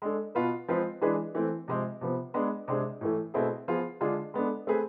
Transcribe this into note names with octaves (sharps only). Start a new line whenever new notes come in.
G#3 D4 A4
B2 B3 F4 B4
F3 G#3 C4 F4 B4
E3 G#3 D4 G#4 B4
E3 A3 C4
C3 F3 G#3 C4
C3 F3 B3
G#3 B3 D4 G#4
C3 G#3 D4 G#4
A2 E3 A3
B2 A3 C4 E4 G#4
F3 B3 F4 G#4
D3 G#3 D4 F4 G#4
G#3 B3 D4 A4
A3 C4 G#4 B4